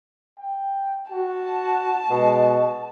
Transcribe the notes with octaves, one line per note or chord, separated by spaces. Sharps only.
G5
F#4 A5
B2 G#3